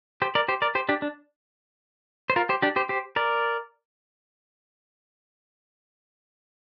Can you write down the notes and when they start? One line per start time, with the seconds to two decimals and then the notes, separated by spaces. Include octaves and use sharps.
0.22 G4 C5
0.35 A#4 D5
0.48 G4 C5
0.62 A#4 D5
0.75 G4 C5
0.89 D4 G4
1.02 D4
2.30 C5
2.36 F4 A#4
2.49 G4 C5
2.62 D4 G4
2.76 G4 C5
2.89 G4 C5
3.16 A#4 D5